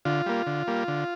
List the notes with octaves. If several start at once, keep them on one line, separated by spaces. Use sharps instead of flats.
D3 F4
G3 A#3
D3
G3 A#3
D3